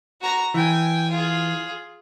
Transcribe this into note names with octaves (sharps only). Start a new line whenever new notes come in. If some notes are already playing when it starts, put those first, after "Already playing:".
F#4 A#5
E3 G5 G#5
F4 G#4